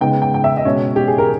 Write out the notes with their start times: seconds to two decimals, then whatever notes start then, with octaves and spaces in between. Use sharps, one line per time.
0.01 C#3 G#3 B3 D#4 G5
0.22 G5
0.34 G5
0.44 E5
0.57 D#5
0.65 B2 G#3 C#4 C#5
0.96 G4
1.08 G#4
1.18 A#4